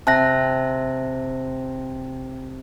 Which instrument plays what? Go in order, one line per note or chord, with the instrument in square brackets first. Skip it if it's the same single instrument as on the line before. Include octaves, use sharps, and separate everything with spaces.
[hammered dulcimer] C3 [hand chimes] A5 F#6 A#6